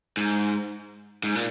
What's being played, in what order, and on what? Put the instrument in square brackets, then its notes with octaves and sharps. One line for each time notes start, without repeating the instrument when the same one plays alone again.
[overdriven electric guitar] G#2
G#2
A#2